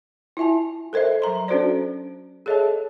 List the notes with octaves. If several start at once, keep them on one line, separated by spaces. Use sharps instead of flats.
E4 F4 E5 G#5 A5
A4 A#4 C5 D#5 E5
F#3 E5 A#5 C6
C#4 D4 F#4 A4 C5 D5
G#4 A4 C#5 D#5 E5 A5